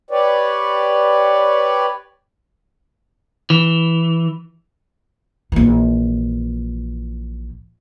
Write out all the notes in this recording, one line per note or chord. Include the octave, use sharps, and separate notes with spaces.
G4 B4 C#5 D5
E3
A#1 E3